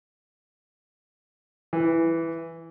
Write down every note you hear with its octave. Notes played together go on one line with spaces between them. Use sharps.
E3